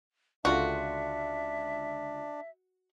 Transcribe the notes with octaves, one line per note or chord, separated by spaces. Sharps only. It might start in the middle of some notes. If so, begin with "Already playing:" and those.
C#2 D3 D4 F4 F#4 E5